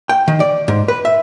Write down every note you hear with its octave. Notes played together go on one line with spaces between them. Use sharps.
G5
D#3
D5
G#2
B4
E5